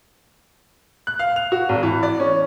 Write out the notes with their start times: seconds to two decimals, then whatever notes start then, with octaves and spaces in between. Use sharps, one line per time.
1.07 F#6
1.19 F5
1.36 F7
1.52 F#4
1.69 G#1
1.83 E3
2.03 D5
2.20 C#4